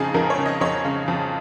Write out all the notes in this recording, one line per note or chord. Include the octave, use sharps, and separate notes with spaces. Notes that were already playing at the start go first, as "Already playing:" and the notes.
Already playing: F2 C#3 D#4 G#4
F2 A#4
C#5
C#3
D#5
F2 C#5
C#3
F2